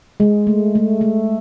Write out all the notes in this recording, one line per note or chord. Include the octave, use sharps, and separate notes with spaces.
G#3
A3
A3
A3